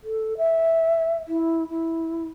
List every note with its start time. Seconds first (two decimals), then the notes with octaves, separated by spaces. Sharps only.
0.04 A4
0.38 E5
1.28 E4
1.69 E4